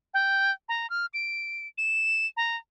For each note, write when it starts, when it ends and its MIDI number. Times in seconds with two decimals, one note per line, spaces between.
0.14 0.51 79
0.69 0.89 82
0.90 1.06 89
1.14 1.68 98
1.78 2.27 100
2.37 2.56 82